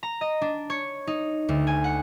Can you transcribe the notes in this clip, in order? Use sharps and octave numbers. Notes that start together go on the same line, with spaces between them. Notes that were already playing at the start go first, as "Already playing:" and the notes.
A#5
D#5
D4
C#5
D#4
D2
G#5
F#5